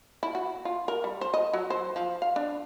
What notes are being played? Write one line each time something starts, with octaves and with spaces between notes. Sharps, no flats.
E4
F#4
F4
A#4
G3
C5
D#5
F#3
C5
F3
F5
D4